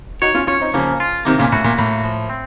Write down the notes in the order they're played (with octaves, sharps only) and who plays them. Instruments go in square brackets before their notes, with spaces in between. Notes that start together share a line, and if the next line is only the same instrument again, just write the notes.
[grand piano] D#4 F#4 [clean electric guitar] C#5
[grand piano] C#4 F4
[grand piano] C#4 F4 [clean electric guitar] C#5
[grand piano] C4 D#4
[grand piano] C#3 F3 [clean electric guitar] A#3
[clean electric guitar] F4
[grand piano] C3 D#3 [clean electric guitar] A#3
[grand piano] A#2 C#3
[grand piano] A2 [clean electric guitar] F#4
[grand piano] A#2
[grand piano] A2 [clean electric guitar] A#3
[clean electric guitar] F3
C4